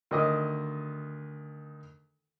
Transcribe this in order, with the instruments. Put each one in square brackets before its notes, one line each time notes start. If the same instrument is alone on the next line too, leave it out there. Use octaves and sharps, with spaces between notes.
[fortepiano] D2 D#3 D#5 D6 D#6